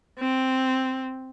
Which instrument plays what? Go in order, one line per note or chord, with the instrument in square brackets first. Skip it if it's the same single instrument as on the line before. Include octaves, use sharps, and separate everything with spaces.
[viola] C4